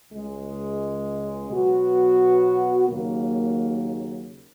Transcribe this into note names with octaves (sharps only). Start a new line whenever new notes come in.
C#2 C#3 G#3
B2 F#3 B3 F#4
D#2 C#3 F#3 A#3